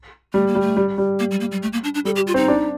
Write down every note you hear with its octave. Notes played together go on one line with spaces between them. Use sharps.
G3 A3
A#3
G3
A3
G3
G3
A#3
G3
A#3
G3
A3
A#3
D4
D4
G3 A4
G4
F4
C4 D#4
D4